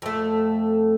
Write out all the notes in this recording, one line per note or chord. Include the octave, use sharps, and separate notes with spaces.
F2 A3